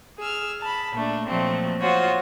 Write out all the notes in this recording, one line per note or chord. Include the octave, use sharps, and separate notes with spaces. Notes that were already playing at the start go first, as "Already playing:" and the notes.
G#4 E6 F6
A5 B5
A#2 A3 D4
A#2 F3 F#3 A3 C4
F4 F#4 C5 C#5 F#5 D#6